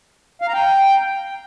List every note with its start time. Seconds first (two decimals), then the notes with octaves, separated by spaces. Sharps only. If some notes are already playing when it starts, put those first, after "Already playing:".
0.42 F5
0.48 A#5
0.54 G5